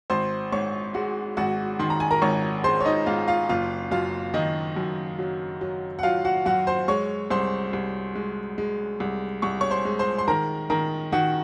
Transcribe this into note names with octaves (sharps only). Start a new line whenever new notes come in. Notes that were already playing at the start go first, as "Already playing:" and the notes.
G#1 C5 C6
G#2 C#5 C#6
G#3 F#4 F#5
G#1 F#4 F#5
D#3 C6
A#5
G#5
A#4 A#5
G#1 C#5 C#6
G#3 C5 C6
C#5
D#4 D#5
G#2 F4 F5
F4 F5
F#1 F4 F5
F#2 F4 F5
D#3 D#4 D#5
F#2
F#3
F#3
F#5
F#3 F4 F5
F#4 F#5
F#2 F#4 F#5
C5 C6
G#3 C#5 C#6
C2 C5 C6
C2
G#3
G#3
C2
C2 C#6
C#5 C#6
C5 C6
G#3
C5 C6
C6
D#3 A#4 A#5
D#3 A#4 A#5
D#3 F#4 F#5